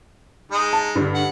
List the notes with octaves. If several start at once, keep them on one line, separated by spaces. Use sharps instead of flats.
G#3 D#4
A5
G2 D3
F#5